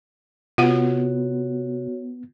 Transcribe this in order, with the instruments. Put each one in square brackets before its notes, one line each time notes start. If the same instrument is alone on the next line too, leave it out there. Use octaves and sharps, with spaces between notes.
[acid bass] C3 [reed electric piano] B3 [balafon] F4 F#5 [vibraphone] F#4 C#5